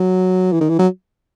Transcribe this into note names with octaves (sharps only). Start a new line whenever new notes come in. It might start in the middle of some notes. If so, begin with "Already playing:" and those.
Already playing: F#3
E3
D#3
E3
F#3